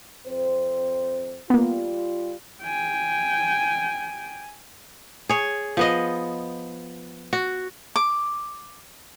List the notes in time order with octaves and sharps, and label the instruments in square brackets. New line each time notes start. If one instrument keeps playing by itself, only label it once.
[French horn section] F2 C4 C5
[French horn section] G3 F4 [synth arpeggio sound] A#3 B3
[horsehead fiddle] G5 G#5
[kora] G#4 C#5
F3 B3 D#5
F#4
[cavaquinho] D6